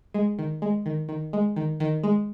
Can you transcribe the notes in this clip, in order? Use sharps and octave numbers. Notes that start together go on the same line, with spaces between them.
G#3
D#3
G#3
D#3
D#3
G#3
D#3
D#3
G#3